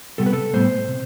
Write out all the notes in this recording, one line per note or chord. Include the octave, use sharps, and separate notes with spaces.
C3 G3 B3 A4
B4
A4
A2 G3 B3 C5
C3